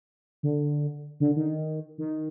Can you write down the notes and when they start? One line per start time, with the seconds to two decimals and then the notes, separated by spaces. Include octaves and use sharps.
0.43 D3
1.20 D3
1.36 D#3
1.98 D#3